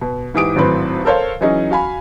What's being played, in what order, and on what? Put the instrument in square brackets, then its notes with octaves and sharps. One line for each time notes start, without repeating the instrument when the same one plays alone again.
[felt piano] B2
G#2 E3 G4 D#6 D7
G#1 A2 F#3 C4 B4 C5
A4 A#4 C5 C#5 F5
E3 F#3 C#4 D#4 G#4 D#5
F#4 F5 G#5 B5